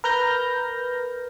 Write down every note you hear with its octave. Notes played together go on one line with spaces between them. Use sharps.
A#4 B4 F6 G6 A#6